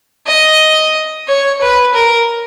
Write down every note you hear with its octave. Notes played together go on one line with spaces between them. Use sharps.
D#5
C#5
B4
A#4